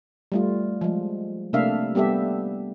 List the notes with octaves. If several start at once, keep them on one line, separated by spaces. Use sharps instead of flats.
G3 A3 F4
F3 G#3
C3 A3 A#3 D4 E5 F5
G3 B3 G4 A4 E5